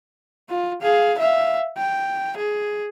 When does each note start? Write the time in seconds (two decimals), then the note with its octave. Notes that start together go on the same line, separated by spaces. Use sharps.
0.50 F4
0.82 G#4 F5
1.19 E5 F5
1.77 G5
2.38 G#4